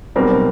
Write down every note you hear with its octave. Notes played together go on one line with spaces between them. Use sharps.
B1 B2 G3 C4 A#4